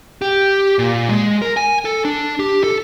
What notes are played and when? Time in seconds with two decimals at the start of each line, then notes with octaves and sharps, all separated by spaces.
0.22 G4
0.79 A#2
1.09 G#3
1.42 A#4
1.57 G#5
1.85 A4
2.05 D4
2.39 G4
2.64 A4